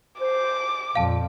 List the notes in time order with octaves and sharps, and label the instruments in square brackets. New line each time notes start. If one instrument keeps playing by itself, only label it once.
[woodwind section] C5 [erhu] D6
[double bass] F2 [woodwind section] A#2 [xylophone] F5 A5